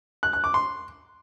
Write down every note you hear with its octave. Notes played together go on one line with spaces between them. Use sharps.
F#6
F#6
D6
C6